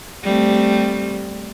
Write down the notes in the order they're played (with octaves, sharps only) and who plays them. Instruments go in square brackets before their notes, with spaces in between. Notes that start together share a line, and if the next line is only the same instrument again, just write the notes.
[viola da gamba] G3 A3 C4